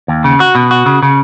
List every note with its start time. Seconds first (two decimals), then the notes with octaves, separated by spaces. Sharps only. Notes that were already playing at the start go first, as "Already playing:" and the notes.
0.08 D#2
0.24 C#3
0.40 F#4
0.55 B2
0.71 F#4
0.86 C#3
1.03 C#3